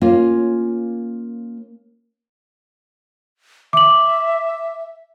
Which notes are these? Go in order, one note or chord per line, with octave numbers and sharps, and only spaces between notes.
A#3 C#4 F4
E5 D6 F#7